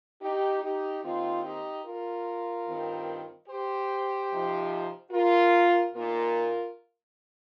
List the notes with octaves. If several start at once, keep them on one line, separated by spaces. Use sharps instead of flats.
D#4 G4
D#4 G4
D#2 D#3 C4 D#4 F4
D#4 G4
F4 A#4
G2 D#3 C4
G4 C5
C3 F3 D#4
F4 A#4
A#2 A#3 D#4 F4 A#4